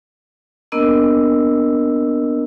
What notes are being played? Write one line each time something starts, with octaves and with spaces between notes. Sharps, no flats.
A#3 B3 D4 A#4 D#5 E6